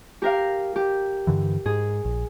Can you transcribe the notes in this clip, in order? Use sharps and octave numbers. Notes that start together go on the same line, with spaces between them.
G4 A#4 F5
G4
G2 D3 E3
G#2 G#4
A#1